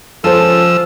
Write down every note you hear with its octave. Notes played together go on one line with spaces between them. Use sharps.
C#2 F3 A4 C5 G#5 E6